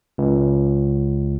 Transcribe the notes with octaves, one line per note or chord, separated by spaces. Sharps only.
C#2